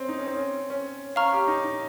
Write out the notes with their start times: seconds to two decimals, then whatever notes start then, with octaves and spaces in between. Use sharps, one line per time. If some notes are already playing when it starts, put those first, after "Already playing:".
Already playing: C4 C#4
0.08 D#4
0.18 C#4
0.26 C4
0.36 C#4
0.70 C#4
1.16 C#4 F5 A#5 C#6 F6
1.33 G4
1.47 D#4
1.64 D#4